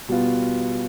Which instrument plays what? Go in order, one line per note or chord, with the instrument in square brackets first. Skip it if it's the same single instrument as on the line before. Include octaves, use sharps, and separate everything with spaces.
[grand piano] B2 G3 B3 F4